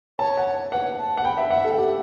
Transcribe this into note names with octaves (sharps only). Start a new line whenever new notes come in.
C#5 A5
F#5
B4 F#5
A5
F#5
G5 B5
E5
E5 F#5
A4
G5
G4 F#5